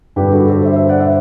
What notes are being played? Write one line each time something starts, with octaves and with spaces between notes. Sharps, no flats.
G2 D3 G4 B4
F#4 A4
A4 C5
C5 E5
C5 E5
D5 F#5
C5 E5